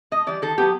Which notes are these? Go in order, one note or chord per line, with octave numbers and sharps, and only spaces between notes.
A2 D#5
E3 G3 D5
D#3 A4
F#3 B3 G4